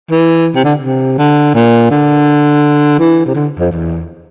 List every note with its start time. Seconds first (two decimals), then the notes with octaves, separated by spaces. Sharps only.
0.11 E3
0.55 C3
0.64 D3
0.82 C3
1.18 D3
1.54 A#2
1.91 D3
2.99 E3
3.26 C3
3.35 D3
3.59 F2
3.72 E2